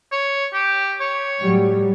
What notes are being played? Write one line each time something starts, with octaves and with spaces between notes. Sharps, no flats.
C#5
G4
C#5
A2 F#3 G3